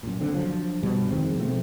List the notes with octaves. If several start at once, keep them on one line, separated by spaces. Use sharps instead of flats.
F#2 A#2
F#1 D3 C4
D3 F3 F#3
G2 B2 G3
F2 D#3 G#3 C4
B2 F3 A3 C4